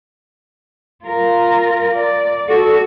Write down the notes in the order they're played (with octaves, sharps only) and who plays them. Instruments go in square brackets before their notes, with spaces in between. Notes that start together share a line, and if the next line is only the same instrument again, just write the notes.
[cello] F4 A#4
D5
[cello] F#4 [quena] A4